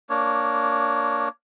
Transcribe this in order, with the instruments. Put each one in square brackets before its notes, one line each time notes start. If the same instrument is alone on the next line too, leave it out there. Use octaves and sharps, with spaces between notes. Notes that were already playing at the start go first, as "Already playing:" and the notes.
[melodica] A#3 D4 C#5